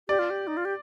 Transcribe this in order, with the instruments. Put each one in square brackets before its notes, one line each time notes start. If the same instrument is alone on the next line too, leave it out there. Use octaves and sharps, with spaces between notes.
[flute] G4 [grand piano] D5
[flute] F4
G4
D#4
F4
G4